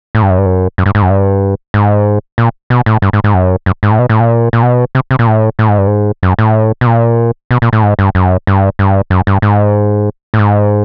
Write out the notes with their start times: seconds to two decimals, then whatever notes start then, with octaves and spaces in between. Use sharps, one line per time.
0.15 A2
0.22 G2
0.30 F#2
0.38 G2
0.46 F#2
0.78 F#2
0.86 G2
0.95 G#2
1.02 F#2
1.10 G2
1.74 G#2
2.38 A#2
2.70 B2
2.86 A2
3.02 G2
3.13 G#2
3.24 G#2
3.34 F#2
3.66 F#2
3.83 G#2
3.91 A2
3.99 B2
4.09 A2
4.20 A#2
4.53 A#2
4.63 B2
4.95 C3
5.11 C3
5.19 A#2
5.27 A2
5.59 A2
5.68 G#2
5.78 G2
5.87 G#2
6.23 F#2
6.39 A2
6.81 B2
6.87 A#2
7.51 B2
7.62 A#2
7.73 A2
7.83 G#2
7.99 G2
8.15 F#2
8.47 G2
8.79 G2
9.10 F#2
9.27 G2
9.42 G#2
10.34 A2
10.39 G#2